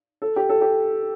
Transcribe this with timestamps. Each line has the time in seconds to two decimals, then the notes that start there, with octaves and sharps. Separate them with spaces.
0.22 A4
0.36 G4
0.49 A4
0.61 G4